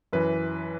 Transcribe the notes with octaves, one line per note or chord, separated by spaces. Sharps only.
F#2 E3 B4